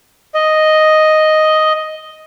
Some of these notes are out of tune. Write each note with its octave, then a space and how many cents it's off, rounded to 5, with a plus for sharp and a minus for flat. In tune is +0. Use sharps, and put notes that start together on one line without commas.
D#5 +0